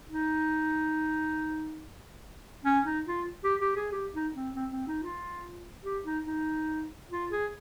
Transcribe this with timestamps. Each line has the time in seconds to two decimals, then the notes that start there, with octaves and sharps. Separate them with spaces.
0.09 D#4
2.65 C#4
2.85 D#4
3.07 F4
3.44 G4
3.61 G4
3.76 G#4
3.92 G4
4.14 D#4
4.35 C4
4.55 C4
4.72 C4
4.88 D#4
5.03 F4
5.83 G4
6.05 D#4
6.26 D#4
7.11 F4
7.32 G#4